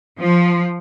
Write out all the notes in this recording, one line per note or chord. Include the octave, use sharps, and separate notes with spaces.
F3